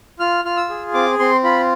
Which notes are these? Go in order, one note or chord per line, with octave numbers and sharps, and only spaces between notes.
F4 F6
F4 F6
E6
G#4
C4 D6
C4 C6
F4 B5